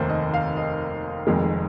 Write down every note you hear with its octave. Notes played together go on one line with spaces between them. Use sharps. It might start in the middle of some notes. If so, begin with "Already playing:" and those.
Already playing: F1 D#2 D#3 A#3 C5
D#5
F5
D#5
F1 F2 D#3 G#3